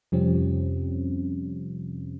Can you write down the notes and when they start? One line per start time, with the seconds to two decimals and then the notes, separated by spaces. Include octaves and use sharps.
0.12 F2 C3 F3 G3 C4 C#4